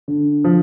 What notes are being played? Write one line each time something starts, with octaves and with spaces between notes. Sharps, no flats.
D3
F3